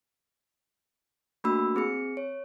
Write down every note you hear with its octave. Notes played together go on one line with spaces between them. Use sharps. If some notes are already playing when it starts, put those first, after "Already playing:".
A3 A#3 D4 F#4 B5 E6
C4 G#4 C#7
C#5